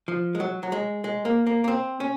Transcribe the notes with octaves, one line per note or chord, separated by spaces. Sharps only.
F3
G#3
F#3
F#3
G#3
G#3
A#3
A#3
A#3
C4
C#4